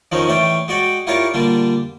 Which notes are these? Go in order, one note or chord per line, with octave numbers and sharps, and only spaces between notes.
D#3 F3 C4 C#4 D#4
A2 E3 C#4 D5 G5
G#3 F#4 D5 F#5 G5
E4 F4 G4 A#4 C#5 D5
A#2 D3 G3 D4